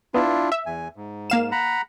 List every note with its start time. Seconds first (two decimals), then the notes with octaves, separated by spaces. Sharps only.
0.14 B3 D4 E4 F4
0.52 E5
0.66 E2 G#5
0.96 G#2
1.30 A#3 F5 E7
1.52 F#5 A#5 B5